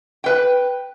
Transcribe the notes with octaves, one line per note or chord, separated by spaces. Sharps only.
B4 G5